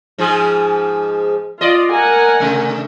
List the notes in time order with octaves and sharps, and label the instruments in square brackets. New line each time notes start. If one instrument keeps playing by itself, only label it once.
[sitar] G#2 F3 G#4
[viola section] F4 [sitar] D5 D#5
[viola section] A#4 F#5 G#5
[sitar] C3 A3